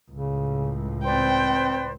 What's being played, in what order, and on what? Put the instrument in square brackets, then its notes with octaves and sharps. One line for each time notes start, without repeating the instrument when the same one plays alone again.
[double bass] C#2 A2 [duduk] C#3
[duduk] C4 [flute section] B4 C5 D5 [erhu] G5